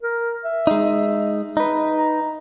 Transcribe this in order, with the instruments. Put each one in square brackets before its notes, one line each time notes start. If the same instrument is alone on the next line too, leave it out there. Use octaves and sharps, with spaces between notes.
[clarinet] A#4
E5
[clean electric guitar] G#3 D#4
D#4 B4
[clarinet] A#5